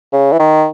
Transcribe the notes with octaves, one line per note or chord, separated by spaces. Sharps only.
C#3
E3
D#3